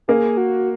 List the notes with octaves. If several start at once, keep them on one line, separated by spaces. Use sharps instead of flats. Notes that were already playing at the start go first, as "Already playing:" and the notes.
A#3 G#4
F#4